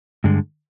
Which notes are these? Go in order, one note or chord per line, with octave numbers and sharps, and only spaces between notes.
G2 D3 G#3